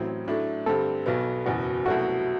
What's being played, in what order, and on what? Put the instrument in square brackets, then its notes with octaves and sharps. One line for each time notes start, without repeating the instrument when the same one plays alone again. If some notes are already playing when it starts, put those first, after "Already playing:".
Already playing: [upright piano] A1 A2 F#3 C4
A2 F#3 A3 D4
[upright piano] G2 D3 G3 C4 [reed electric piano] A4
[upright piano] B1 B2 F#3 B3
[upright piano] F#1 E2 B2 [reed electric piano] F#4
[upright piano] C2 B2 F#3 A3 [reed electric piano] F#4